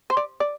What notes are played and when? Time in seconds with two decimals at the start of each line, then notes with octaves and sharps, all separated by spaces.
0.10 C5
0.17 D5
0.40 D5